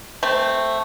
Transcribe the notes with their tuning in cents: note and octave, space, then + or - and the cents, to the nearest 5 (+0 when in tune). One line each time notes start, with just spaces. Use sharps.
A3 +0 C4 +0